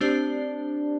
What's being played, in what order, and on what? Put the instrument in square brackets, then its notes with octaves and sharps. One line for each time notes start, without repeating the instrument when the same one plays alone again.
[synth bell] A3 C4 G4 C5 [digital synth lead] D4